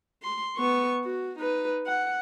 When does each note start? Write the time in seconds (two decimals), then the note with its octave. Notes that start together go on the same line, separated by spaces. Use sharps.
0.23 C6
0.57 B3 C#6
1.05 F#4
1.39 D#4 B4
1.87 F#5